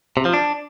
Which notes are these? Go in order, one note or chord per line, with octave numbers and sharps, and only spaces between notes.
C3
F3
D4